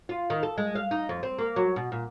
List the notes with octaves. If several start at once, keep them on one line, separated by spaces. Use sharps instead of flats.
F4
D#3
A4
G#3
F5
D#4
F2
C4
A#3
F#3
B2
A#2